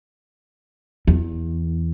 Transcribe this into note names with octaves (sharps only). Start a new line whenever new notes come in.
E2